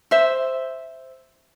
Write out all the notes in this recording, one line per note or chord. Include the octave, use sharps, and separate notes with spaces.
C5 E5